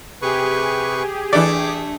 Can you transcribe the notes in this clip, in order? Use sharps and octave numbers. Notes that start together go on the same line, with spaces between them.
C3 G4 G#4 B4 C#6
E3 A3 D4 D5 D6